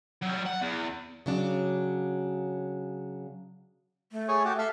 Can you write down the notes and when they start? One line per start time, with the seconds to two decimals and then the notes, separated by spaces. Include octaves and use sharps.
0.22 F#3 G3
0.46 F#5
0.62 E2
1.26 C#3 F#3 D4
4.12 A3
4.28 G#4 C#5
4.45 F#4 G4
4.58 A4 E5 F5